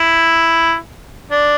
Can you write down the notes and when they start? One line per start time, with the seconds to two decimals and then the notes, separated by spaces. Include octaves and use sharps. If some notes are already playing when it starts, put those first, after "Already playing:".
Already playing: E4
1.31 D4